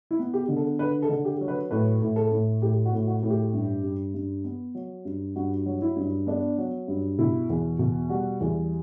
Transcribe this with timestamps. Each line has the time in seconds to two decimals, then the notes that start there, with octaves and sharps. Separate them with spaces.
0.11 E4
0.19 B3
0.33 G4
0.48 D3
0.57 A4
0.79 D3 B4
1.02 A4
1.09 D3
1.25 G4
1.41 F#3
1.48 B4
1.71 A2 B4
2.02 A2
2.16 A4
2.32 A2
2.62 A2 G4
2.85 F#4
2.93 A2
3.07 F#4
3.23 A2
3.30 G4
3.53 G2
3.83 G2
4.14 G2
4.44 B3
4.75 F#3
5.05 G2
5.36 G2 F#4
5.66 F#3
5.82 E4
5.96 G2
6.27 B3 D4
6.58 F#3
6.88 G2
7.18 B2 E4
7.49 E2
7.79 B2
8.10 G3 F#4
8.40 E2